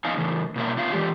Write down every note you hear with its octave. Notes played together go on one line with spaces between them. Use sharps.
B3 D#4 F5 G#5
A2 C#3 E3
B2 A#3 E5
B3 D#4 F4 E5 F5
E3 G#3 A3 G4